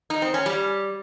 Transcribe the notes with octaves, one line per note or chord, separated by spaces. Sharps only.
D#4
C4
C#4
G3